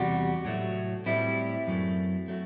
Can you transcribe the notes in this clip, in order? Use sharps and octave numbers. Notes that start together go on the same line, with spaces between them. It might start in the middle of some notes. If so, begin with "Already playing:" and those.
Already playing: E2 C3 G3 F#4
A2 F#3 A3
A2 G3 C4 E4
F#2 F#3 A3
F#3 A3